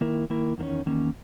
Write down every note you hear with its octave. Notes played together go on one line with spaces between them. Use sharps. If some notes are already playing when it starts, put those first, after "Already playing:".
D#3 A#3 E4 A#4
D#3 A#3 E4 A#4
E2 D#3 A#3 C#4
E2 D#3 A#3 C#4